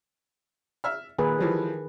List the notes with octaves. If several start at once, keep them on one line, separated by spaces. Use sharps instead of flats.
E5 F6
A#2 D#3 G#4 B4
E3 F3 G3